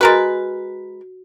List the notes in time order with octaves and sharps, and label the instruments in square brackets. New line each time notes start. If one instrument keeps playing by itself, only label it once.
[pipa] G#3 A#4 B4 [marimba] F#4 A6